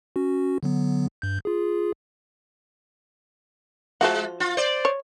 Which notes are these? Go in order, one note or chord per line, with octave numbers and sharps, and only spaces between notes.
C#4 F#4
D3 F#3 B3
G2 G6
F4 G#4
F3 G#3 F#4 F#5
F4
C5 D5
C#5